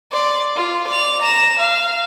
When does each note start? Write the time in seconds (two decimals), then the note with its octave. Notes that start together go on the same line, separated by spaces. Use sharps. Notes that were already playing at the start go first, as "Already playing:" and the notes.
0.12 D5 C6
0.56 F4
0.87 D5 F7
1.22 A#5 E7
1.58 F5